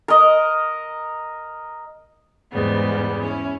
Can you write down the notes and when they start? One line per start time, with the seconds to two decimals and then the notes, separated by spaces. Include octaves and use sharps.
0.08 A#4 D#5
2.51 E2 G#2 C#3 G3 B3
3.20 C#4 E4